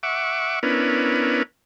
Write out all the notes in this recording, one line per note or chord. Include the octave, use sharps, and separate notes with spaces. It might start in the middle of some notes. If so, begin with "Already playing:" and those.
E5 F#5 C#6 D6
B3 C#4 D4 E4 A#4 B4